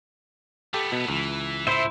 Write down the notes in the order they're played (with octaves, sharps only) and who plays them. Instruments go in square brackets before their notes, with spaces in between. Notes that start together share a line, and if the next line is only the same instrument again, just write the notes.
[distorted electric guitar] A3 B3 [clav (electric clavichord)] G4 A4
[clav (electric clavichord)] B2
[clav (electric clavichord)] C#2 [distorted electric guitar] E3
[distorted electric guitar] A2 [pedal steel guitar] E4 C5 E5